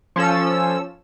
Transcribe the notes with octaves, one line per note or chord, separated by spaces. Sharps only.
F3 C#4 A4 E6